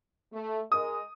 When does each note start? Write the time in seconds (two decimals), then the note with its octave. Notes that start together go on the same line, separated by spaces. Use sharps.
0.33 A3
0.72 G#3 A#4 D#5 D#6